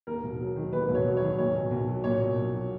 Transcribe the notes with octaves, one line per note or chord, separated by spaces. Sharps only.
D#2 A#4
E1
F#3
D#3
D#2 B4
E1
C#5
F#3
C#5
D#3
A#2 C#5
B1
B1
F#3
A#2 C#5
B1
B1
F#3